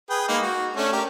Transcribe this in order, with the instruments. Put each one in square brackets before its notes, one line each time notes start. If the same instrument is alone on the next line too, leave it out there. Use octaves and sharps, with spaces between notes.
[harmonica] G#4 B4 G5
G#3 A#3 D#4
F#4
A3 C#4 D4
G4 A#4